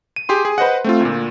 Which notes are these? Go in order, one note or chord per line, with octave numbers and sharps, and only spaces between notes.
D#7
G4 G#4 C6
G#4
B4 C5 D#5 F#5
A3 C4 F4
D2 A#2